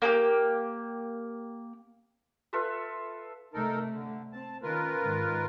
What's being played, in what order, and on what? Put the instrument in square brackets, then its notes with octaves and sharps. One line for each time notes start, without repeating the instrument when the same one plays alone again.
[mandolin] A#3 D4 G4
[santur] F4 A4 B4 E5
[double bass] C3 A3 [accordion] D#4 A4 A#4
[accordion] D3
[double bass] C4 [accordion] A5
[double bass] D#3 C#4 [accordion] F4 A#4 B4
[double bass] G#2 D#3